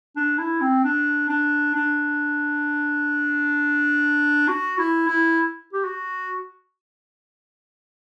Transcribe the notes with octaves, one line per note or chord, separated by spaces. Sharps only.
D4
E4
C4
D4
D4
D4
F#4
E4
E4
G4
F#4